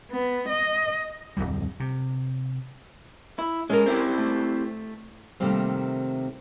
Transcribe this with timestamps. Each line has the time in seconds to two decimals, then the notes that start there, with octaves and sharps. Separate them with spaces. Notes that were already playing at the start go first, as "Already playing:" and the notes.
0.11 B3
0.49 D#5
1.37 D1 G1 F2 G3
1.80 C3
3.39 E4
3.70 G#3 C#4 A4 A#4
3.86 C4 E4 G4
4.18 A3
5.40 C3 D#3 G3 A3 A#3 C4